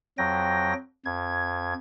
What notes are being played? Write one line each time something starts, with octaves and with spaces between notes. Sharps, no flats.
F2 F#3 G5 A#6
F2 G#6